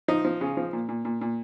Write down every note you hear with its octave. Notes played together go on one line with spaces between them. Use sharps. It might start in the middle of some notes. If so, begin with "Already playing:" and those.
F3 D#4
F3
C#3
F3
A#2
A#2
A#2
A#2